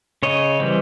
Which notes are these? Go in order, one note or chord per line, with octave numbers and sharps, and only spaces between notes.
C#3 C#5 D#5
E3 G3 C4